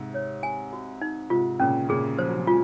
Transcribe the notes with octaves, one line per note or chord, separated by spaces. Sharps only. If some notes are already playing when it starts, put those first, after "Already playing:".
Already playing: G#2 C3
C#5
G#5
F#4
D#4
G#2 C3 F4
A#2 C#3 C#4
A#2 C#3 G#4
F3 C5
F#3
C#3 F3
F3 G#3 F4